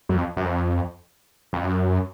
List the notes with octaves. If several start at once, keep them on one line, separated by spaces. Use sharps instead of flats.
F#2
F2
F#2
F2
F2
F#2